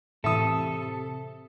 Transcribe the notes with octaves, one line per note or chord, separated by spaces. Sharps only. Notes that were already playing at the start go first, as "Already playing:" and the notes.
A2 C3 E3 A4 E5 D#6